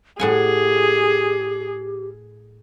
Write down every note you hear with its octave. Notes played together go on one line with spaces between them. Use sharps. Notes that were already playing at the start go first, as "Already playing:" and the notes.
A2 G4 G#4 F#5 G#5